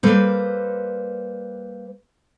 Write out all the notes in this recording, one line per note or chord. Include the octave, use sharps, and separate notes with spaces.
G3 A#3 A4 B4 C5